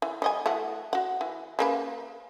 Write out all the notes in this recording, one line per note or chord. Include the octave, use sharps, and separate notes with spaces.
E3
G3 D#5 G#5
E3 A3 F#4
F#4 F#5
E3
C#3 A#3 B4